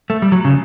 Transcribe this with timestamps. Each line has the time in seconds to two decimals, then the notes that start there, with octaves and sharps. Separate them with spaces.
0.10 A3
0.22 G3
0.32 F#3
0.45 C#3